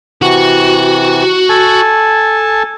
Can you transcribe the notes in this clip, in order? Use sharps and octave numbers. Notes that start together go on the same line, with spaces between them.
C3 E3 F#4
A4 G#5 A5